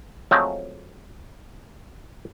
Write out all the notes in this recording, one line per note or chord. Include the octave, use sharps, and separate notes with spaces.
F3 F#3 G#3 A3 C4